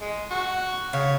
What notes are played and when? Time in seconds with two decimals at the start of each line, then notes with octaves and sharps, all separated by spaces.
0.01 G#3
0.31 F#4
0.93 C#3 C#5